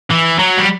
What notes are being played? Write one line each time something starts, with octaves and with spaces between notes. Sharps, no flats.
E3
F#3
G3